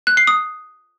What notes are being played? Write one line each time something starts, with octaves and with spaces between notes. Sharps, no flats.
F#6
C7
D#6